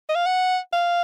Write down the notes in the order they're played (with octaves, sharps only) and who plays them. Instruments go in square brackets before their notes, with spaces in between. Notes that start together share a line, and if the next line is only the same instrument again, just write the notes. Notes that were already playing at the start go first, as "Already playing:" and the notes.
[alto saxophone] D#5
F5
F#5
F5